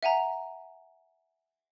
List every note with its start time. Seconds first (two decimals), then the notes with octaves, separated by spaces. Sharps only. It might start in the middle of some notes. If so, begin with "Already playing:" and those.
0.03 E5 F#5 G#5 A#5